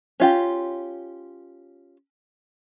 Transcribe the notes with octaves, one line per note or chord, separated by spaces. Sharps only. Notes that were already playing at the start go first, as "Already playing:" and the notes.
C#4 F4 G4